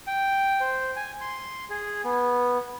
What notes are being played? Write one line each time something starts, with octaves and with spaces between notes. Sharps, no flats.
G5
C5
G#5
C6
G#4
B3